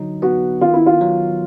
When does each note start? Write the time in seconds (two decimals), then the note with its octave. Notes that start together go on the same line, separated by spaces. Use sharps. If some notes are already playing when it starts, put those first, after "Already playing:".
Already playing: D3 F#3 D#4
0.22 B3 F#4
0.61 D#3 F4
0.74 E4
0.86 F4
1.01 F#3